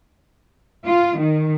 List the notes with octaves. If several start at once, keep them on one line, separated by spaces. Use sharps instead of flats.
F4
D#3